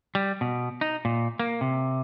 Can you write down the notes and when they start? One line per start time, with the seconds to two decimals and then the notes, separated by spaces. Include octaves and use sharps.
0.15 G3
0.41 B2
0.81 D#4
1.05 A#2
1.39 A#3
1.61 C3